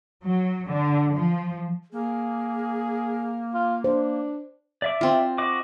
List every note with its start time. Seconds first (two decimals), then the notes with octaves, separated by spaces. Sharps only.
0.24 F#3
0.68 D3
1.14 F3
1.92 A#3 G#4
3.54 F4
3.84 D4 C5
4.82 D5 E5 D6
5.01 C4 F4
5.38 F#4 D#5 D6